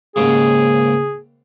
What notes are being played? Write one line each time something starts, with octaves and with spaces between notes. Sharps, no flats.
D#2 G#2 C#3 G#4